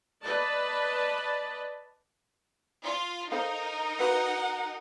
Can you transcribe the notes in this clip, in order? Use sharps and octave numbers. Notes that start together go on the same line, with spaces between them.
B4 D5 D#5 A5
F4
D#4 A4 A#4 C5 F5
F#4 B4 F5 F#5